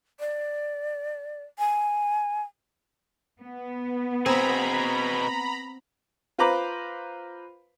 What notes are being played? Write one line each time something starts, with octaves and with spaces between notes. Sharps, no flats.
D5
G#5
B3
B2 C4 G#4 A#5 B5
F4 B4 C5 A#5 B5 D6